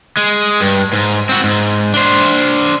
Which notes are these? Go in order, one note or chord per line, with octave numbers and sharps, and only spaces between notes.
G#3
G2
G#2
C4 F#4
G#2
D4 C5